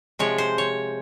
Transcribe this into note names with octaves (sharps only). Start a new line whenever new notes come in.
C3 F3 G#3 C#5
C5
C#5